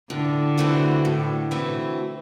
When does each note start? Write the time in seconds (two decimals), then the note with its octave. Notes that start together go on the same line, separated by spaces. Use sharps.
0.10 A2 D3
0.57 E3 A3 C4 F#4
1.05 A2
1.51 E3 A3 C4 F#4